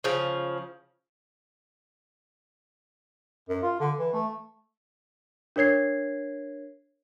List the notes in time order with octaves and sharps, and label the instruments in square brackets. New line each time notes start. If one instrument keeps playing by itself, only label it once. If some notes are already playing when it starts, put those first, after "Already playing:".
[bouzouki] C#3 F3
[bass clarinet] F#2
F4
D3
E3
A3
[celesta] D4 A#4 C#5 G#6 C7